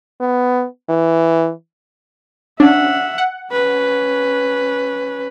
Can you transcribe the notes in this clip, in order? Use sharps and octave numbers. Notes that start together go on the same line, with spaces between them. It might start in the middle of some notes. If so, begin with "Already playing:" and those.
B3
E3
C#4 D4 E5 F#5
F#5
C#4 B4